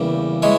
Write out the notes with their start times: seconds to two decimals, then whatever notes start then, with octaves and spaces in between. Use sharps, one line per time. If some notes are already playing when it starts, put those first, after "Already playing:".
Already playing: E2 C#3 E3 G3 A#3
0.42 E3 G#3 C#5